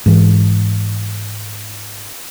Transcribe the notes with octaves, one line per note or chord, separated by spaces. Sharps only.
G#2 E3